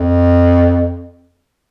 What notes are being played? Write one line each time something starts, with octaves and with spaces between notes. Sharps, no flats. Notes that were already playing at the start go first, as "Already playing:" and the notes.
Already playing: F2